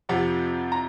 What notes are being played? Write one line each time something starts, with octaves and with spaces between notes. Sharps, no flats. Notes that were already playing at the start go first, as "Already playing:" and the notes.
F2 C3 F3 F#5
A#5